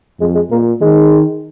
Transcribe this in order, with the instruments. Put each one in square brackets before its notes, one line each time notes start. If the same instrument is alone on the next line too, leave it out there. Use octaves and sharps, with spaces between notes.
[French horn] F2 [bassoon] G#3
[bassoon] G#3
[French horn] A#2 [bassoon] A#3
[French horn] D#3 [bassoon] G#3